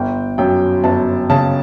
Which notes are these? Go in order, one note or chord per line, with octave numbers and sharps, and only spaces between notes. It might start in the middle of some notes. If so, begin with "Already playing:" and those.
Already playing: G1 G5
F#2 G5
G1 A5
C#3 A5